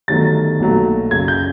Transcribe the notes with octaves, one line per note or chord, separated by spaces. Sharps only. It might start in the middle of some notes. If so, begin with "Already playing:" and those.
G1 G2 D#3 F#3 A3 A6
B1 A#2 F#3 A3
F#2 C#3 F#3 G#6
G6